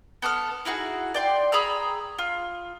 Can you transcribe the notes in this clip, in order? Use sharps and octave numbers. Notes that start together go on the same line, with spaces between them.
B3 A4 D6 F6
D#4 E4 F#4 G#4
D5 G5 C6
G#4 A#5 B5 E6
F4